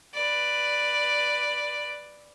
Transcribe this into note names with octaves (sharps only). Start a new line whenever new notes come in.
B4 D5